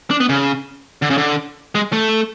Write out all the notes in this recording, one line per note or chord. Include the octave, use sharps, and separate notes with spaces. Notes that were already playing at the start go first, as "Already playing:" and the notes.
D4
B3
C#3
D3
C#3
D3
G#3
A3